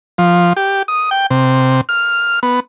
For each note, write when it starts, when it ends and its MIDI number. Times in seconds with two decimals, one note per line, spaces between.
0.18 0.53 53
0.57 0.83 67
0.88 1.10 87
1.11 1.26 79
1.30 1.81 48
1.89 2.40 89
2.43 2.60 59